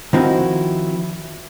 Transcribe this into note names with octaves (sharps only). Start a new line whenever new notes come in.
D#3 F3 C4 D#4 E4 F#4